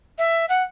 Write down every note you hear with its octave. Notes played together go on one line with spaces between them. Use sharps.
E5
F#5